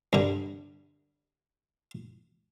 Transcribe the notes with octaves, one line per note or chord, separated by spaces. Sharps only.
G2 D3